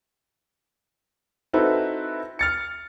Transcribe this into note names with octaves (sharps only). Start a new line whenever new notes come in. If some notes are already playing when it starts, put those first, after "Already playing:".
C4 D#4 E4 F#4 A4 B4
F6 A6 C#7